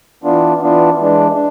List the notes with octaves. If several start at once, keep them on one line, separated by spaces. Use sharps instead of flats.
E3 B3 D4 F4
E3 B3 D4 F4
E3 G#3 D4
D4